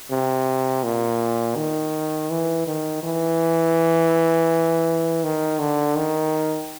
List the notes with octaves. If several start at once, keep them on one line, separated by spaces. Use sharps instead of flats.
C3
A#2
D#3
E3
D#3
E3
D#3
D3
D#3